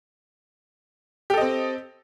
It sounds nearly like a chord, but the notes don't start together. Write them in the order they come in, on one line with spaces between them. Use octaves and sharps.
G4 A4 D#5 C4